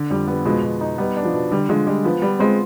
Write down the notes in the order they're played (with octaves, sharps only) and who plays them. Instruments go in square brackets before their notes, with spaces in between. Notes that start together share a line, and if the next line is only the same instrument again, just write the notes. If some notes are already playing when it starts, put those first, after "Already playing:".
Already playing: [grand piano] D3
[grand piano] F2 [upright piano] G3
[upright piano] G3 [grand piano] B3
[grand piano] B2 [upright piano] F3 G#3
[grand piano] B2
D#4
[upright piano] G3 [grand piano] B3
[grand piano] D4
[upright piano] F3
[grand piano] B2
[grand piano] D3 [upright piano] G3
[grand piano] D3 [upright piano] F3 G#3
[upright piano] G3 [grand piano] G#3
[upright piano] F3 [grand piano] B3
[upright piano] G3 [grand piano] B3
[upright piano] G#3 C4 [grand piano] F4